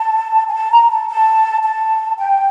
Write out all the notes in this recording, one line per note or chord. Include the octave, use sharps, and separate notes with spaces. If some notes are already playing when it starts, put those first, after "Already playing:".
Already playing: A5
G#5
A5
A#5
A5
A5
A5
G5